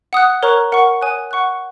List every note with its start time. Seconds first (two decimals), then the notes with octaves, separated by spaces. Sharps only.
0.13 F#5 D#6 F#6
0.43 A#4 C#5 A#5 C#6 F#6
0.72 A#4 F#5 C#6
1.02 C#5 G#5 D#6 F#6
1.31 F#5 C#6 F#6